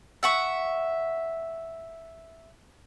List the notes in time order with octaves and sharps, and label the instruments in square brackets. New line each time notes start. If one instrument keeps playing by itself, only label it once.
[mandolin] E5 F#5 C#6